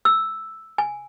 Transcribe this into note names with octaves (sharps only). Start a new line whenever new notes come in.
E6
G#5